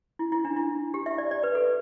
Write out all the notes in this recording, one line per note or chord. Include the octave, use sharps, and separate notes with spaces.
E4
E4
D4
E4
G4
E5
D5
D5
B4
A4